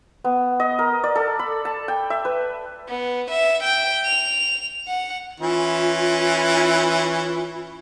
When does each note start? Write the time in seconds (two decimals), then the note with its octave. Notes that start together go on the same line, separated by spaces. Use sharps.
0.24 B3
0.60 D#5
0.79 A#4
1.04 D5
1.15 A4
1.39 B5
1.65 A5
1.88 G5
2.10 E5
2.25 B4
2.89 B3
3.31 E5
3.63 G5
4.05 F7
4.88 F#5
5.40 E3 C#4 E4 F4